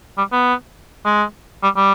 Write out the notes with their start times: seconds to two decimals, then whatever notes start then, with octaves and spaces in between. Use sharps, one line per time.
0.18 G3
0.32 B3
1.05 G#3
1.63 G3
1.76 G3